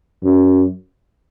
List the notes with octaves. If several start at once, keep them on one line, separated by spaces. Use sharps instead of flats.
F#2